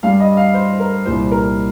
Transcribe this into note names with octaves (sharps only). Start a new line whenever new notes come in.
G2 G3 F5
D#5
F5
C5
A#4
C2 A#2 G3 C5
A#4